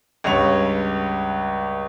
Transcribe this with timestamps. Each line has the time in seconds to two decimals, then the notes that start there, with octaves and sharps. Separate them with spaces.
0.24 C#2 G2 C#5 F7